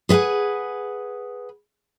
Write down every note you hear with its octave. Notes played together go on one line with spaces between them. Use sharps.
G#4 B4 F5 F#5 G#5